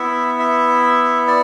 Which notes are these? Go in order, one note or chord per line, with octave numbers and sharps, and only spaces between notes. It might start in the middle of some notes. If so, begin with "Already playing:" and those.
Already playing: B3 E4 E5
E5
D5